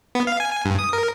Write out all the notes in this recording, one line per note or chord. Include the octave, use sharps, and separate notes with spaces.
B3
F5
G#5
G#5
G2
D#6
A#4